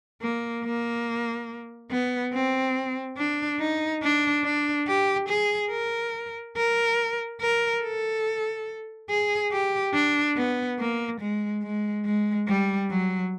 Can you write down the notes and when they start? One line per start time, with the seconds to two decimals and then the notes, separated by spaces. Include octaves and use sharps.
0.22 A#3
0.65 A#3
1.91 B3
2.33 C4
3.18 D4
3.60 D#4
4.03 D4
4.44 D4
4.88 G4
5.29 G#4
5.71 A#4
6.57 A#4
7.41 A#4
7.83 A4
9.10 G#4
9.51 G4
9.94 D4
10.36 B3
10.79 A#3
11.21 G#3
11.63 G#3
12.05 G#3
12.48 G3
12.91 F#3